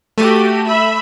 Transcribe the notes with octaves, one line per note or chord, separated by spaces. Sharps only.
A3 F#4 G4 D#7
E5 B5